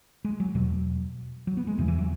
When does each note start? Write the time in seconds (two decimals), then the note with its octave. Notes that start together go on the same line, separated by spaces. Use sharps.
0.25 G#3
0.40 F#3
0.54 E2 B2 F#3
1.47 F#3
1.57 B3
1.67 G#3
1.78 E2 C#3 E3
1.88 E3
1.99 F#3